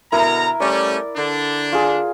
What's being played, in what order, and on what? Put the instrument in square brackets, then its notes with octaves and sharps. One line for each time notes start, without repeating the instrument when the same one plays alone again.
[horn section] B2 D3 A#5 [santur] E4 A#4
[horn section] G3 A3 C#4 [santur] D5
[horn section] D3 D4
[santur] F4 G#4